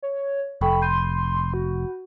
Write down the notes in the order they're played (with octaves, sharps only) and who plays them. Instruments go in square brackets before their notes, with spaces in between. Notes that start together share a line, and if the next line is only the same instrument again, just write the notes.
[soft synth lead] C#5
[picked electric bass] F1 [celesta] A4 G5 C#6 [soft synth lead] B5
[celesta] B5 G6 D#7 [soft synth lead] C6
[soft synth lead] F#4